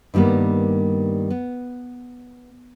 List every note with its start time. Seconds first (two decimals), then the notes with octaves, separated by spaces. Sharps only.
0.14 G2 D#3 G3 A#3 B3
1.30 B3